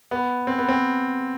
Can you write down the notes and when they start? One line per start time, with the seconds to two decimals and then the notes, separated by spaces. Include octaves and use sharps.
0.11 B3
0.47 C4
0.58 B3
0.68 C4